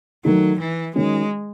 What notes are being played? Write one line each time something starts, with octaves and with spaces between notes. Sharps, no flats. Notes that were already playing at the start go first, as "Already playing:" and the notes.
D#3 F#3 A3 D#4
E3
D#3 F#3 G#3 C#4